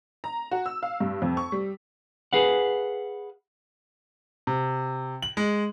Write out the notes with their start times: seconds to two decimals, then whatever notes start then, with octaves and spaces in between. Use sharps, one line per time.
0.24 A#5
0.51 F#4
0.66 E6
0.83 F5
1.00 G2
1.22 F2
1.37 C#6
1.52 G3
2.33 G#4 B4 F5 F#5
4.47 C3
5.23 F#7
5.37 G#3